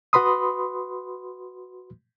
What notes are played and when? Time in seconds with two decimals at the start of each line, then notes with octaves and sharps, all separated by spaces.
0.13 F#4 B4 B5 C6 D#6